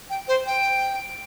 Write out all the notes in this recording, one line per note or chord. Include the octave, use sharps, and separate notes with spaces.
G5
C5
G5